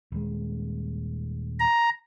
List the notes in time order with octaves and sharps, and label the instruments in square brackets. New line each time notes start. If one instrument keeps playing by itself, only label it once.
[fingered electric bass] D#1 G#3
[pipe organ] A#5